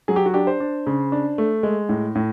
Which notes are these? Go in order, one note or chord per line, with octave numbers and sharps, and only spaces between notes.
F#3 G#4
G4
F#4
D4 G4
C5
D4
C#3
D4
A3
G#3
A2
A2